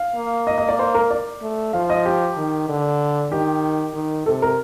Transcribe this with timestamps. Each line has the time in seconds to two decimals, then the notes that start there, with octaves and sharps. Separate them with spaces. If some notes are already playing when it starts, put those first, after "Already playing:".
Already playing: F5
0.16 A#3
0.47 D#5
0.58 D#5
0.69 D5
0.79 C5
0.95 A#4
1.11 D5
1.42 A3
1.73 F3 F5
1.90 D#5
2.06 G4
2.37 D#3
2.68 D3
3.31 D#3 G4
3.94 D#3
4.26 C3 A4
4.42 A#4